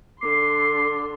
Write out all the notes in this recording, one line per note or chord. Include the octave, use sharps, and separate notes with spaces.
D3 C6 D6 C7